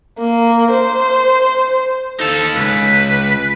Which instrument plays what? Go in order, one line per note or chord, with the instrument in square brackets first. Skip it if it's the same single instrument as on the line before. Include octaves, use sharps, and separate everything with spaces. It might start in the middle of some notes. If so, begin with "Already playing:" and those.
[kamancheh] A#3
C5
[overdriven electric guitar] D#4 F5 [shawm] A4
[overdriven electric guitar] C#2 [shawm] B4